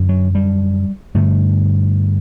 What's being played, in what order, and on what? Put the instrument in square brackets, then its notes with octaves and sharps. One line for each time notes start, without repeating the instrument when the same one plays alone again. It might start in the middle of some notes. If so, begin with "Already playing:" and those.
Already playing: [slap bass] F#2 D3
F#3
G3
G2 D3 A3